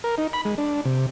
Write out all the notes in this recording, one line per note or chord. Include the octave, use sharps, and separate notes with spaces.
A#4
D#4
B5
G#3
D4
C3